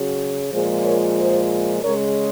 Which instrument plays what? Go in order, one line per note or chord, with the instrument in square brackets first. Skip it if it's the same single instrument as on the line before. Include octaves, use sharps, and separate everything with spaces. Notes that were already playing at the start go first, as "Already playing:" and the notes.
Already playing: [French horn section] C#3 F#3
A#2 F3 G#3 G#4 C5
A#4 C#5
G#4 C5
C#3 G#3 A#4 C#5